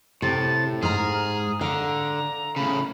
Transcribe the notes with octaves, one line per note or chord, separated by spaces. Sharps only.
A2 C3 A6
G#2 G#4 A#5 F6
D3 F5 A#5
A2 C#3 B5